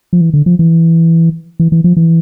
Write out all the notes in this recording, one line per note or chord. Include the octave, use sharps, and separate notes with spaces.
F3
E3
D3
F3
E3
E3
E3
F3
E3